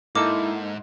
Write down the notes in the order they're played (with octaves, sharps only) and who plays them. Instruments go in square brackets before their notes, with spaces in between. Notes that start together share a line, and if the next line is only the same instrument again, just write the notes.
[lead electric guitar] G#2 [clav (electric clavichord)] A#3 D#4 A4 [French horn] E4 [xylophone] D6